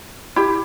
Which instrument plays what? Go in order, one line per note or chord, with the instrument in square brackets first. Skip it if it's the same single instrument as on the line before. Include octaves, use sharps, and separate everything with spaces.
[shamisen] E4 G4